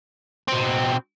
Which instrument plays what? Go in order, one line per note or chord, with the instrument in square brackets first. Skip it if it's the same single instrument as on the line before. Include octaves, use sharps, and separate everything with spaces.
[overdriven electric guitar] B2 C4